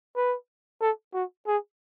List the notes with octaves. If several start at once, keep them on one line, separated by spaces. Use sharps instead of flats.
B4
A4
F#4
G#4